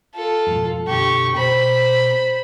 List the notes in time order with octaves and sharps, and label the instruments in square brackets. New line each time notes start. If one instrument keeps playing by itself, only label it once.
[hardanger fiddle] F4 A4
[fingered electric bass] F2 G#2 B2
[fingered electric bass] F#2 B2 D3 [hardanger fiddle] G4 C#6
[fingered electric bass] B2 [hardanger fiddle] C5 B5